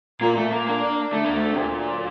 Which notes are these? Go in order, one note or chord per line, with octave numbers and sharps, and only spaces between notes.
A#2 A#3
A#2 A3
A#2 A#3
A#3 D4
D4
D4
D3 A3
D2 A#3
A3
D3
C3
D2 A#2
F#3
D3